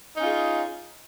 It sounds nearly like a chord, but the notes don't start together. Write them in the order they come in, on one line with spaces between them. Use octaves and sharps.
D#4 C#4 F4 G#4